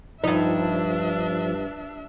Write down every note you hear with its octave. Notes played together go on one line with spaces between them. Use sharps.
G2 F3 D4 D#4 E5